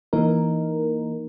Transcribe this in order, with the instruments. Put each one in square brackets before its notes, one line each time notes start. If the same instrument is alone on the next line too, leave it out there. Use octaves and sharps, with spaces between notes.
[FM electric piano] E3 A#3 D#4 A#4